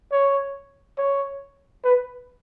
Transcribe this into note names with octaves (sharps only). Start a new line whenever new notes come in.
C#5
C#5
B4